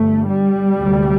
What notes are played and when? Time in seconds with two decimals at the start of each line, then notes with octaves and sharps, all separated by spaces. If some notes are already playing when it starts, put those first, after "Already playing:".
Already playing: G1 G2 A3
0.28 G3
0.75 D2 C3